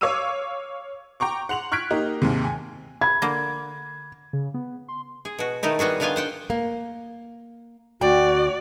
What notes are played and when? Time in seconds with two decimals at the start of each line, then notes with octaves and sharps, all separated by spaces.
0.01 C#5 F5 D6 E6 D#7
1.20 G5 A#5 C#6 D6
1.49 F#5 C6 F7 F#7
1.72 C#6 F6 F#6 G#6 B6 D7
1.90 A#3 D#4 G4
2.22 D#2 G#2 C3
2.44 G#5
3.01 B5 G#6
3.22 D3 A#3
4.33 C#3
4.54 B3
4.89 C6
5.25 G#4
5.39 B2 F#4
5.63 D#3 A3 D#4 E4
5.79 G3 B3 F#4 G#4
6.00 D3 D#3 B3 F4 F5 G#5
6.16 C5 F#5 G5
6.50 A#3
8.01 D2 F#4 D5 G5